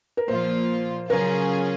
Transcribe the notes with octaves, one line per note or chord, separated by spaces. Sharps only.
A#4
A#2 F3 A#3 F4 C5
C#3 F#3 C#4 F4 G#4 A#4